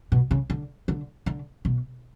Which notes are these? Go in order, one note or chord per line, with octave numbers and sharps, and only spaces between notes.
B2
C#3
D3
D3
D3
B2